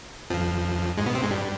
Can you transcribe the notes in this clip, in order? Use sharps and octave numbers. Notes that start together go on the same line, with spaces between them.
F2 F3
G#2 G#3
B2 B3
C3 C4
G#2 G#3
G2 G3